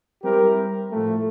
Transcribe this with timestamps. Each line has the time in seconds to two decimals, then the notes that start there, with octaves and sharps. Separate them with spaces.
0.23 G3 C4 E4 G4 A#4
0.91 A2 F3 A3